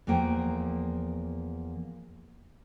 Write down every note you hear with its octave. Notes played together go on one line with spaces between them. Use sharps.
E2 F3 A3 A#3 G5